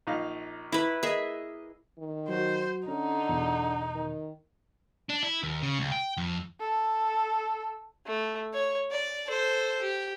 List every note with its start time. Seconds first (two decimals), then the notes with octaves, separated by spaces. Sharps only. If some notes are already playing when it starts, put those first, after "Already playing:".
0.07 A#1 D#4 F5
0.72 E4 B4
1.03 A#3 G#4 D#5 E5
1.98 D#3
2.29 F#3 F#4 C5
2.88 D3 C#4 D#4
3.29 E2 B2
3.95 D#3
5.09 D4
5.23 E4
5.43 D#2
5.62 C#3
5.79 C#2
5.92 G5
6.17 F2
6.60 A4
8.06 A3
8.53 C#5
8.91 D5
9.27 A4 C5
9.81 G4